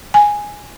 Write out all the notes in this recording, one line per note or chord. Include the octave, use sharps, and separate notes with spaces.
G#5